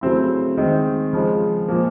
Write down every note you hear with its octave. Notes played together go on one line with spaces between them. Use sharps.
C#3 F#3 A3 C4 E4
D#3 G#3 C4
C#3 F3 G#3
A#2 F3 A#3